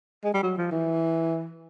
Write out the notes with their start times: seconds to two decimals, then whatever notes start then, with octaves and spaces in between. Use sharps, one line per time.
0.24 G#3
0.34 G3
0.43 F#3
0.57 F3
0.71 E3